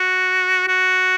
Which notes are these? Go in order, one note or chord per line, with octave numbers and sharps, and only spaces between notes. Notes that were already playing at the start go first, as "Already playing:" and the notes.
Already playing: F#4
F#4